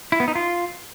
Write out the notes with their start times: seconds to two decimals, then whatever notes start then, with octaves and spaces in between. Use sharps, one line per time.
0.12 E4
0.20 B3
0.28 D#4
0.35 F4